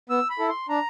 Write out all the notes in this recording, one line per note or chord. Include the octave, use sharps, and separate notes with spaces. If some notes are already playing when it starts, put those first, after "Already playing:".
B3 E6
B5
E4 A4
C6
D4 A#5